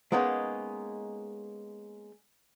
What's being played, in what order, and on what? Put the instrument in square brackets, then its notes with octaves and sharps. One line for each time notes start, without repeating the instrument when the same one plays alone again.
[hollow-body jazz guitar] G#3 A#3 B3 C#4 D#4